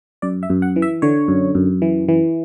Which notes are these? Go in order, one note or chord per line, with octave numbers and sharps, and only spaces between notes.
F#2 D5
E5
F#2
F#5
E3
E5
D3 C#5
F#2
F#2
E3
E3